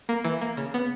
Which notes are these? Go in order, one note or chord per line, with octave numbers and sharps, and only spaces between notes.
A#3
E3
A#3
C#3
B3